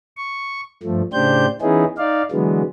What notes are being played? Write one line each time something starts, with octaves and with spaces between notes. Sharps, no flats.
C#6
G2 F3 A3
A2 C#3 D4 G4 C5 G6
E3 B3 C#4 D#4 E4 G#4
D#4 D5 F5
D3 E3 F#3 G#3 B3